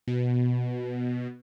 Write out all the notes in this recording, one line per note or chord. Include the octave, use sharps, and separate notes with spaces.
B2